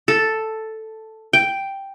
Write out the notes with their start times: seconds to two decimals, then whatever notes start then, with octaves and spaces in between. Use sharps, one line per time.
0.08 A4
1.33 G5